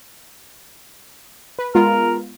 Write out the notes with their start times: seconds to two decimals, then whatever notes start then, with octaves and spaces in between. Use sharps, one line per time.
1.59 B4
1.75 G#3 B3 F4 A#4